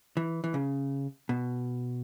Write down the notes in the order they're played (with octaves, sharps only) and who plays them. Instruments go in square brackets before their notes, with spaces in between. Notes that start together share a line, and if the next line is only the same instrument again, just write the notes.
[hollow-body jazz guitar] E3
E3
C#3
B2